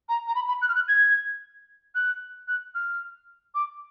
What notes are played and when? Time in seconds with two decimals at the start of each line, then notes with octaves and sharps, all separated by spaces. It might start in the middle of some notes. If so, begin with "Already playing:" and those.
0.09 A#5
0.28 A#5
0.35 B5
0.48 B5
0.62 F#6
0.68 F6
0.75 F#6
0.88 G#6
1.95 F#6
2.48 F#6
2.75 F6
3.55 D6